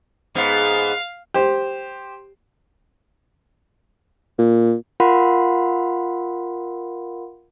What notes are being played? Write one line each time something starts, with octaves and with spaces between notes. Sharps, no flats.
G#2 B3 F5
G4 C5
A#2
F4 A#4 F5 F#5 B5 C6